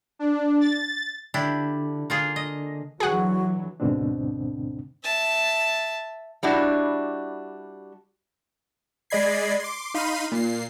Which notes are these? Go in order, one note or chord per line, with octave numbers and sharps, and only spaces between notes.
D4
A6
D3 D4 E4 G4
D3 A#3 F4 G#4
D#5
D3 E3 F#3 F#4 G#4 F#5
D2 G#2 B2 D3 C4 D4
E5 A5
G3 D4 E4 F#4
G#3 D5 D#5 B5 G#6 C7
C6 D6
D#4 F5 B5 C6 D#7
A#2 C7